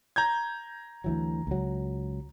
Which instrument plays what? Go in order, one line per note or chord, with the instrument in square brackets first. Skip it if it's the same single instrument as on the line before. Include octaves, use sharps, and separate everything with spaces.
[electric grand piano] A#5 G6 G#6
[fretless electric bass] D2 E3 F#3
C#2 F#3